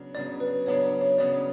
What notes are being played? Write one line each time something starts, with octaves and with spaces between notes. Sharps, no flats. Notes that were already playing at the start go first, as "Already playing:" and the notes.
Already playing: C#3 F#3 B3 D4
C#3 F#3 B3 D4 D5
B4
C#3 F#3 B3 D4 C#5
C#5
C#3 F#3 B3 D4 D5